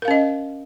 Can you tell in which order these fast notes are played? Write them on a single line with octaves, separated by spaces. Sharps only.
A#4 F5 C#4 D#5